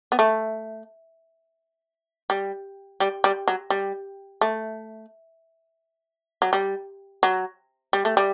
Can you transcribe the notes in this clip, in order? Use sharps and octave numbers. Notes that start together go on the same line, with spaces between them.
B3
A3
G3
G3
G3
F#3
G3
A3
F#3
G3
F#3
G3
A3
G3